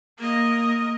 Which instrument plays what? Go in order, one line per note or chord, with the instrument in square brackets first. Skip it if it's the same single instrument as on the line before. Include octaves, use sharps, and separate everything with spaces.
[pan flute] A#3 [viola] A#4 D#5